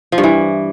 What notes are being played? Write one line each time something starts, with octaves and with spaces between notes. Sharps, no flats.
F3
G2
E3